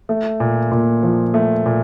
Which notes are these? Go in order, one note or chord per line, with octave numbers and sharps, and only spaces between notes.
A3
A#2
A#2
F3
A3
A#2